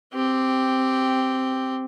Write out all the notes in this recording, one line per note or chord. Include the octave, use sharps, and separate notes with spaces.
C4 G4